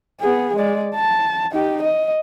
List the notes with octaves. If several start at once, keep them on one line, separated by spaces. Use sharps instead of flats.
B3 G#4
G#3 D5
A5
D#4 G4
D#5